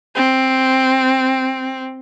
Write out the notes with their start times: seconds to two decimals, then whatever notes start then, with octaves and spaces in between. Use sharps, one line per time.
0.15 C4